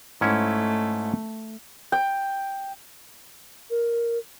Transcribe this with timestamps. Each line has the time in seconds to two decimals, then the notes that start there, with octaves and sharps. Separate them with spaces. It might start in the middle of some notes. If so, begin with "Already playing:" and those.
0.21 G#2 A3 C#4 E4
1.92 G5
3.70 A#4